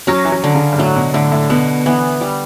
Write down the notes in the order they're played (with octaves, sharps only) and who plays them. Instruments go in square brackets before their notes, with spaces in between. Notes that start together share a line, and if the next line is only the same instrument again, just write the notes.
[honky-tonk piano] F#3 [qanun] C#4
[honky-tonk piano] E3
F#3
[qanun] D3
[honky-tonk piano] C#3
G2
[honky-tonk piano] A2 [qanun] F#3
[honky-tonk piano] B2
[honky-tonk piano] A2 [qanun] D3
[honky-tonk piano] A2
[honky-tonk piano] B2 [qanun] B3
[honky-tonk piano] E3 [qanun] B3
[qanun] G3